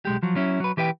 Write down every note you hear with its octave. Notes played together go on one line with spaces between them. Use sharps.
B1 G#3 G4
F3 F#3
F#3 C#4 E4
F#3 B4
E3 G4 B4 E5 G5